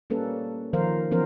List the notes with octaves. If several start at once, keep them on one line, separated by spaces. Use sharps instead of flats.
G3 A#3 C#4 A4 B4
D#3 F3 A#4 C5 F5
E3 F3 B3 C#4 A#4 C5